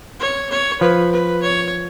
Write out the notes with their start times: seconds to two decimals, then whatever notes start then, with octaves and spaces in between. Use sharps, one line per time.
0.19 C#5
0.50 C#5
0.81 F3 B4
1.11 B4
1.42 C#5